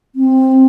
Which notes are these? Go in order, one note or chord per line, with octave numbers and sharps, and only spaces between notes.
C4